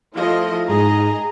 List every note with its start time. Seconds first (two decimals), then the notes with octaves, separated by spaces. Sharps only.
0.16 F3 A3 E4 F4 D#5
0.69 G#2 G#4 D#5 A#5